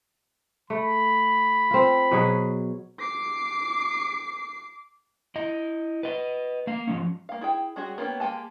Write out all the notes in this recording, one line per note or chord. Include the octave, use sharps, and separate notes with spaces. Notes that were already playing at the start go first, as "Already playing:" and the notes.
A3 B5
C4 F4
B2 F#3 G#4
D6 C7
E4 D#5
B4 D#5
A#3 F5
F3 G#3 C#4
A#3 F5
E4 G#4 G5
G3 G#3 C#4 F#4 G#4
A#3 B3 C#4 G4
G#3 A#3 G4 G#5 A5